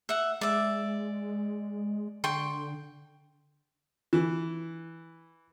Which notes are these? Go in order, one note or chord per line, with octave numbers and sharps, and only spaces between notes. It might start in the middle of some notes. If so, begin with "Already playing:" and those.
E5 F#5
G#3 D5 E5
D3 G5 C6 C#6
E3